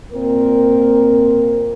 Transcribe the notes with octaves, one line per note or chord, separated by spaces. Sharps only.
A#2 C4 A#4